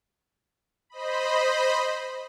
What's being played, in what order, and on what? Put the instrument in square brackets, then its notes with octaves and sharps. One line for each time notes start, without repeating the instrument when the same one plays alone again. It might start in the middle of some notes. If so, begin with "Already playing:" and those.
[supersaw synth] C5 D#5 B5